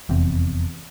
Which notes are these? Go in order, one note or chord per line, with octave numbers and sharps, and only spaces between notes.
F1 E2 C4